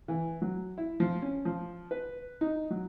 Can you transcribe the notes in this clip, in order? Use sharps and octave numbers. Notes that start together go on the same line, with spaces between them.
E3
F#3
E4
F3
C#4
F3
B4
D#4
F#3